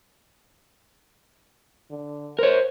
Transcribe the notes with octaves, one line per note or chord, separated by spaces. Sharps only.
D3
A#4 C5 C#5